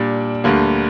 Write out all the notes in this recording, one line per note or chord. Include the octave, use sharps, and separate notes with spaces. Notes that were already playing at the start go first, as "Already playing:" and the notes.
Already playing: A#2 G3 D4
D2 D3 G3 A#3